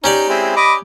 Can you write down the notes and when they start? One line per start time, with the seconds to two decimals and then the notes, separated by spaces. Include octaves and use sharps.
0.04 C#4 D#4 G4 D5
0.29 G#3 C4 E4
0.56 D#5 B5 D6